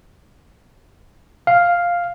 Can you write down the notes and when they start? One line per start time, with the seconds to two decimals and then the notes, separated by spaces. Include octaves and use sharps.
1.47 F5